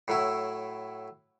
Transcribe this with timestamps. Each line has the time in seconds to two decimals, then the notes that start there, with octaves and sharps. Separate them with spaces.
0.08 A2 F#3 E4